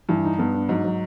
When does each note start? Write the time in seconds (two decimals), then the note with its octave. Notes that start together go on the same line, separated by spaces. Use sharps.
0.09 G2 E3
0.24 D#4
0.38 G2 B3
0.54 D4
0.69 G#2 F#3
0.84 F#3